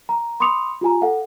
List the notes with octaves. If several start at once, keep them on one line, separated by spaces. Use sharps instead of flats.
A#5
B5 C6 D6 D#6 C#7 F7
F4 G4 G#5 A#5
A4 F5 F#5